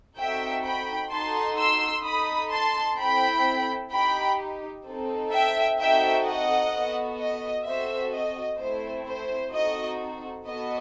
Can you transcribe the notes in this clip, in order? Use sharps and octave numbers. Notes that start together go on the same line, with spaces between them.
C4 D#4 F#4 A4 E5 G5
G5 B5
D#4 F#4 A4 A5 C6
C6 E6
D#4 A4 B5 D#6
A5 C6
C4 E4 A4 G5 B5
D#4 G4 G5 B5
C4 D#4 A4
E5 G5
C4 D#4 F#4 A4 E5 G5
D#5 F#5
B3 F#4 A4
D#5
C4 F#4 A4 C5 E5
D#5
A3 C4 E4 C5
C5
C4 D#4 F#4 A4 D#5
B3 F#4 A4 D#5